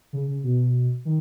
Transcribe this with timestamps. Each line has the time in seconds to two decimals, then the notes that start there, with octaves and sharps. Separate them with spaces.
0.13 C#3
0.28 C#3
0.44 B2
1.05 D#3